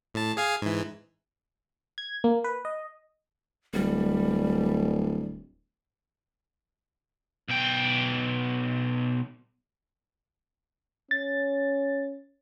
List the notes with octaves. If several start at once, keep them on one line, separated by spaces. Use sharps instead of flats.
A2 A5
G#4 F5 G#5
G#2 E3
G#6
A#3
B4
D#5
D1 G3
B1 G5
C#4 A6